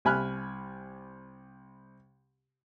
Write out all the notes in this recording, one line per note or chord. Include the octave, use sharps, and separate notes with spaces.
C2 G#5 B5 F6 F#6